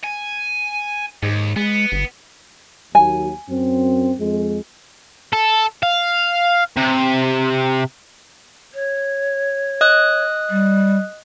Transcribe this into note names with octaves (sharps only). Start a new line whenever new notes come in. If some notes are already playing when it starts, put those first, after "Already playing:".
G#5
D#2 G#2
G#3 B3
G1
D#2 F#3 G#5
F#2 C4
F2 G#3
A4
F5
C3
C#5
D#5 D#6 F#6
G3